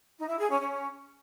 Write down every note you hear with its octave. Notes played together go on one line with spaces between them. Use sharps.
D#4
E4
G#4
C#4
C#4